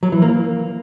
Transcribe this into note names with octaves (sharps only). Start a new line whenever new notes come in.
F#3
E3
A#3